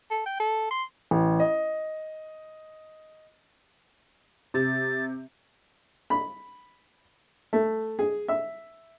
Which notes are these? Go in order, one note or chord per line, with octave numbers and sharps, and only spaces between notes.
A4
G5
A4
C6
A1
D#5
C3 A6
B5
A3
G#4
E5